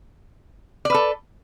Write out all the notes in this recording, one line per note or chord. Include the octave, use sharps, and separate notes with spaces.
A4 B4 D5